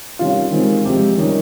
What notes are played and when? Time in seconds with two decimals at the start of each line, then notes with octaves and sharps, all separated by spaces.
0.19 C3 D#3 G3 C#4 F4
0.52 D#3 G#3 C4
0.85 C3 F3 G#3 G4
1.18 D#3 G3 C#4